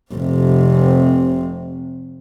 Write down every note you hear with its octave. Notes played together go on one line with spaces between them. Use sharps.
F1 C3